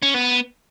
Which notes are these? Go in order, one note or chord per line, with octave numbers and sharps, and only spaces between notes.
C#4
B3